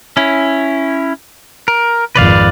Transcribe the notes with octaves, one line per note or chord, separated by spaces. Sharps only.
C#4 E4
A#4
G#1 F2 B4 D5 F5